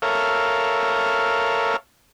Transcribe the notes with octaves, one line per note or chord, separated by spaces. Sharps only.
A4 A#4 C#5 E5 F5